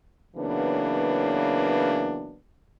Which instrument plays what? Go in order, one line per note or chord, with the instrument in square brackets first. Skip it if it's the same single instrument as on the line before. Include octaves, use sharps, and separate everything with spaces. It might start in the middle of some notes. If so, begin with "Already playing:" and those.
[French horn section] C#3 E3 F#3 A#3 B3 D4